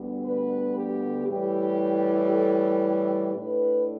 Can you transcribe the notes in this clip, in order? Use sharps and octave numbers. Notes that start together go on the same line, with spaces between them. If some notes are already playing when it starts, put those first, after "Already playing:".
Already playing: D2 D3 G3 B3
B4
G4
A2 E3 G3 G4
A4
A2 A3 D4 B4